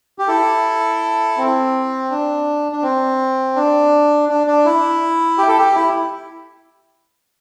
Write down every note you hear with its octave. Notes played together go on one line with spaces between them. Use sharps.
G4
E4 A4
C4
D4
D4
C4
D4
D4
D4
E4
G4
A4
G4
E4